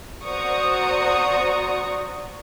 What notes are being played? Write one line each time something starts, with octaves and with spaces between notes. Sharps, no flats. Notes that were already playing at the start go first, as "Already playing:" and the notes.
F#4 C5 D5 A#5 C#6 D#6